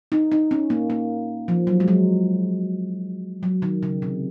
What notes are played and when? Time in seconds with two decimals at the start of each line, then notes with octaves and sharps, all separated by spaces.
0.12 D#4
0.32 D#4
0.51 C#4
0.70 A#3
0.90 A#3
1.48 F3
1.67 F#3
1.80 G#3
1.88 F#3
3.43 F#3
3.62 D#3
3.83 C#3
4.02 C3